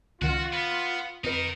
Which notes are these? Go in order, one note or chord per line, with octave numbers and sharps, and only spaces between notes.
C#2 D#3 F4 F#4
B3
F2 D#4 A#4 B4